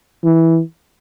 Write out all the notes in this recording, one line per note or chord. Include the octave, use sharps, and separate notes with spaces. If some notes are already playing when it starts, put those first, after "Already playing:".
E3